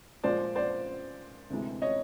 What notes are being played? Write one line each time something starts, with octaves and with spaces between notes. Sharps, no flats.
A#2 F3 G#3 C5 D5
C5 D5
D2 C3 E3 G#3
C#5 D#5